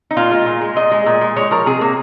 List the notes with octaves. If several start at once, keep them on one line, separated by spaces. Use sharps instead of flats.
D#4
A#2 F4
G#3
A#2
G#3
A#2 D#5
G#3
A#2
G#3
G#3 C#5
F3 A#4
C3 G#4
C3 A#3